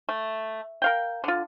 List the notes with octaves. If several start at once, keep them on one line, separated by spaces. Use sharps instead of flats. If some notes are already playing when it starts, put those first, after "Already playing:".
A3
A#4 F5 G5
D3 F4